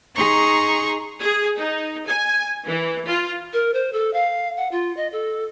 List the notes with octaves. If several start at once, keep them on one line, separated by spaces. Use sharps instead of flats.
D#4 G#4 A#5 C6 C#6
G#4
D#4
G#5
E3
F4
A#4
C5
A4
F5
F#5
F4
D#5
A4